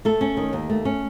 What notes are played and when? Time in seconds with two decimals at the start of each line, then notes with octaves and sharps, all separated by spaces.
0.05 A3 A4
0.21 C#4
0.37 D#3
0.53 D#2
0.70 A3
0.85 C#4